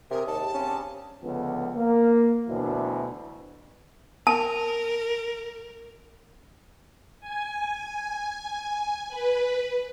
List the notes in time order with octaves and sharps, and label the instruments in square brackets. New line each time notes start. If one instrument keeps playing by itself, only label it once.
[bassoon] C3 [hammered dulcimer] G4 G#4 [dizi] A#4
[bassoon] D#2 [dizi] A5
[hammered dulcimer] C#3 C4 [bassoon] C#4
[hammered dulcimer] D4 A#5
[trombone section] C#2 D3 F3 B3
A#3
D2 B2 E3 F#3 D4 E4
[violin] A#4 [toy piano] A5
[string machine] G#5
B4